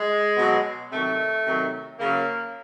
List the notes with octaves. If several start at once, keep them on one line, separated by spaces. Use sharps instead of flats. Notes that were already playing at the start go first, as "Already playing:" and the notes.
Already playing: G#3
B2 F#3
C3 D#3 F#3 A3
C3 D#3 F#3
C#3 F#3 A#3